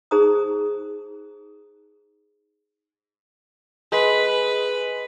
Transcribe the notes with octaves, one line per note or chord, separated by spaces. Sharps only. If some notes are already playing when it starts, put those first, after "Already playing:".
D#4 G#4 C5 A#5 D#6
G#3 B4